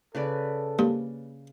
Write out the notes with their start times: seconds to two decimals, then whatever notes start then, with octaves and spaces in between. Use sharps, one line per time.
0.15 C#3 A4 B4 D5
0.79 G2 A#3